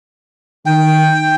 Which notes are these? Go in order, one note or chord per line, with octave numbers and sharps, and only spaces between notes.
D#3 G5